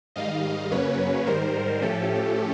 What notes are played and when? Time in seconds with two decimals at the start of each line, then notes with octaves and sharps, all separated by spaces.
0.16 G#2 D#3 G3 D#5 F5
0.71 F#2 C#3 F#3 A#3 C#4 B4 C#5
1.27 G#2 D#3 G3 A#4 C5
1.82 A2 F3 A3 C#4 G4 A4